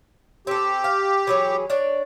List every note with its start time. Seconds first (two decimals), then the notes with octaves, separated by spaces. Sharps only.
0.47 C4 G4 A4
0.84 F5
1.27 E3 F#3 G#4
1.70 D4 C#5 D5